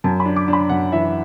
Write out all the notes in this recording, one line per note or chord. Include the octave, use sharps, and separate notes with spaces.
F#2 A5
B5
D4
D6
D4
B5
F#2 F#5
E3 E5